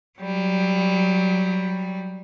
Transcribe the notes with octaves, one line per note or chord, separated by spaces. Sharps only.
F#3 G3